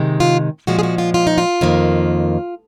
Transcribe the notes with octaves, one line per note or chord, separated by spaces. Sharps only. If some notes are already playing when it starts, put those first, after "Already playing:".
Already playing: C3 D#3 G#3
F4
A#2 F3 G#3 F#4
G#4
F#4
F4
F4
D#4
F4
F2 D#3 A#3